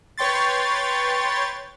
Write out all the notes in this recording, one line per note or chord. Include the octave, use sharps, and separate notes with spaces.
B4 C#5 G5 C6 A6